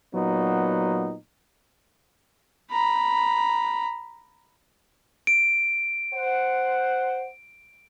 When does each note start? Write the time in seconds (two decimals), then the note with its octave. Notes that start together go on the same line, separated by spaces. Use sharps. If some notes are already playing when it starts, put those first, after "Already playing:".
0.15 A#2 F#3 B3 D#4
2.71 A#5 B5
5.27 D7
6.14 C5 F#5